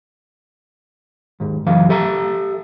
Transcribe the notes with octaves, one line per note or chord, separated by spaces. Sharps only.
D#2 G#2
C#2 F#2 E3 F#3 F5
G4 A4 E5 A#5